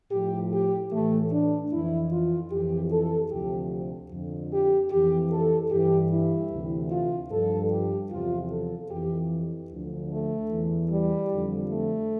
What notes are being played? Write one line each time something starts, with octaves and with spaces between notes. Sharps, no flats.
A2 F3 G4
G4
A2 E3 A3
D4
F2 E3 E4
F4
F2 E3 G4
A4
D2 C3 F3 G4
F2 D3 F3
G4
F2 E3 G4
A4
G2 E3 G4
E4
D2 C3 E3
F4
G2 F3 A4
G4
E2 C3 F3 F4
A4
F2 E3 G4
D2 D3 F3
A3
E2 E3
G3
F2 D3 F3
A3